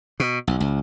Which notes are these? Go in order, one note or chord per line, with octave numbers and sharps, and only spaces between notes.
B2
B1
C#2